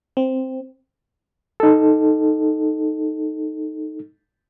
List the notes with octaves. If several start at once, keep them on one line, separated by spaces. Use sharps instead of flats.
C4
D#4 A4